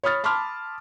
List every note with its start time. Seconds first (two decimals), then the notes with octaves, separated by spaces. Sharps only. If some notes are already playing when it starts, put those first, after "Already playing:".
0.03 C#5 B5 D#6 F6 A6
0.24 A5 B5 C6 D6 F6